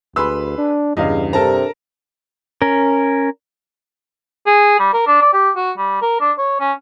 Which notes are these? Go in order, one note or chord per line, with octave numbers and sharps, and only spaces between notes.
D2 G#4 B4 B5 C6 E6
D4
E2 G2 C#3 D#5 F5
C3 D4 A4 A#4 A5 A#5
C#4 A#4
G#4
G3
A#4
D4
D5
G4
F#4
G3
A#4
D4
C#5
C#4